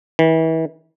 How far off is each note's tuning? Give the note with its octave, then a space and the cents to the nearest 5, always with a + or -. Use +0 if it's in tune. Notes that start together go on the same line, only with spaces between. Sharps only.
E3 -35